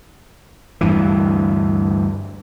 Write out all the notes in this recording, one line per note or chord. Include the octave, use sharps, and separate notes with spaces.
D2 G2 E3